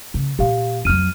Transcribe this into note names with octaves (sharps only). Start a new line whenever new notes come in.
C#3
A#2 A#3 G4 F5
F2 F#3 F6 D#7